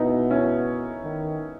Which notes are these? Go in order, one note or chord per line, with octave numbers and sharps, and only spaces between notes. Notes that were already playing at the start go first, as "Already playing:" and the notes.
Already playing: B2 B3 D#4 E4
C#4 E4
D#3